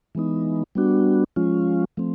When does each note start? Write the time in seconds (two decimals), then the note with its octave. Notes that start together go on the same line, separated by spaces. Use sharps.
0.15 E3 G#3 B3 D#4
0.75 G3 B3 D4 F#4
1.36 F3 G#3 C#4 F4
1.97 F3 A3 C4